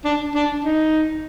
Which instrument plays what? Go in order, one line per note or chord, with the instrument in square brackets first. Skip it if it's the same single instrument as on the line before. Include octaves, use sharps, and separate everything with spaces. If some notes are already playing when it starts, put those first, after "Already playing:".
[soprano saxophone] D4
D4
D#4